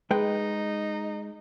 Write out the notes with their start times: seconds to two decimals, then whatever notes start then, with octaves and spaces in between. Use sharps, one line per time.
0.11 G#3 D#4 B4 G5